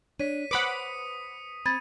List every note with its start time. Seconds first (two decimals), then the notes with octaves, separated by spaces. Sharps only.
0.19 D4 C#5 B6 D#7
0.51 B4 C5 F#5 B5 D6 D#6 B6 C#7
1.66 C4 B5 G#6 A6 D#7